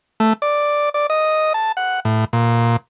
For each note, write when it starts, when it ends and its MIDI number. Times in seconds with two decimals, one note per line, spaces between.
0.20 0.33 57
0.42 0.89 74
0.94 1.07 74
1.10 1.53 75
1.54 1.72 81
1.77 2.00 78
2.05 2.25 45
2.33 2.77 46